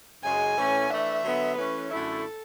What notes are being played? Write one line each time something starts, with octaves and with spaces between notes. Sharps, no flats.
F#2 C#3 G#3 G#5
A2 E3 A3 C#4
E3 A3 D4 E5
D3 F#3 B3
E3 A3 C#4 B4
F#2 D3 A3 E4 A4